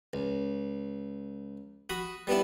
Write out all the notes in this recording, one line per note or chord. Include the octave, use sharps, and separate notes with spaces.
C#2
F#4 B5 D#6
G3 B3 D4 E4